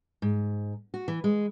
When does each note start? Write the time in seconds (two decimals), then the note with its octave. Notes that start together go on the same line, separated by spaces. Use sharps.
0.22 G#2
0.94 F#4
1.08 E3
1.24 G#3